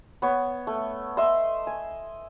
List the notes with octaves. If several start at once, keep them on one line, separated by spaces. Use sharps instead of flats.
B3 C#5
A3
D#5 E5 C6
G#5